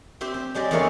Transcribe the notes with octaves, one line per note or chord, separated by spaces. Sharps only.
C4 G4 E5 C6
C4
F#3 G#3 G4 D5
E2 D3 G#3 A#3 E4 C#5